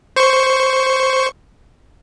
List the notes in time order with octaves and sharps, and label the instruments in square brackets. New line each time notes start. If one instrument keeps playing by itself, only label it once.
[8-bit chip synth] C5 C#6